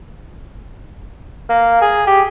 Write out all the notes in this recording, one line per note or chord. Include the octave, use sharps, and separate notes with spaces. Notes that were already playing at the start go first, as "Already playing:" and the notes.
A#3
G#4
G4